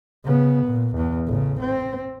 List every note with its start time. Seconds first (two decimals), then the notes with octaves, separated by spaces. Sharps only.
0.25 C#3 B3
0.66 A#2
0.96 E2
1.27 A1 C#3
1.61 C4